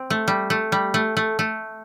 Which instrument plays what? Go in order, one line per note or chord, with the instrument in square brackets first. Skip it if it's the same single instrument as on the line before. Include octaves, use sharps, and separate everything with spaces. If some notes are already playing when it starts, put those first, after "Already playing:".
Already playing: [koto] C4
A3
G3
A3
G3
A3
A3
A3